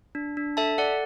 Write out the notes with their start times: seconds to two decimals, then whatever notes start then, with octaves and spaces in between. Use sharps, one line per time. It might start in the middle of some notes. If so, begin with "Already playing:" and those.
0.15 D4
0.37 D4
0.57 A4 E5 A5
0.78 A4 D5 F#5